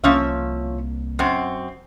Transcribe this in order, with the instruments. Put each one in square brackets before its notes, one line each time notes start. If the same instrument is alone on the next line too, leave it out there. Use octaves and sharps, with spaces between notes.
[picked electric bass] C2 A#3 [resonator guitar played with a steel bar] F3 C#4 E5
[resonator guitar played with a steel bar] F#2 C4